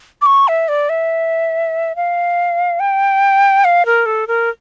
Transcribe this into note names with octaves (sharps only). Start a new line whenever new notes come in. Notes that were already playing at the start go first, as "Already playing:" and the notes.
D6
C#6
E5
D5
E5
F5
G5
F5
A#4
A4
A#4